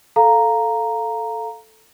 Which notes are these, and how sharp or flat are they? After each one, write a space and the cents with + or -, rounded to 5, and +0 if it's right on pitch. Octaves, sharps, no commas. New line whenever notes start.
A4 +0 F5 +0 A#5 +0